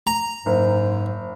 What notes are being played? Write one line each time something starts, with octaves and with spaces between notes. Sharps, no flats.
A#5
F#1 G#2 C5